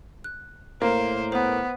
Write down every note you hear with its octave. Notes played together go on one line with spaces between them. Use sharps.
F#6
A2 A#3 C5
B3 B4 C5